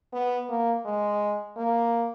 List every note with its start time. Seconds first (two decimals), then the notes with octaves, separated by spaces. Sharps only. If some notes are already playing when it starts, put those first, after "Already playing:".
0.13 B3
0.49 A#3
0.85 G#3
1.56 A#3